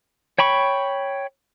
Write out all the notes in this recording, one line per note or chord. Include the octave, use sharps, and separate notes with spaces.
C#5 G5 B5 C#6